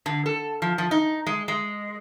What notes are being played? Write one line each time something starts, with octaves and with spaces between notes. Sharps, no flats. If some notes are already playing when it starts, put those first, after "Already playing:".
D3
A4
F3
F3
D#4
G#3
G#3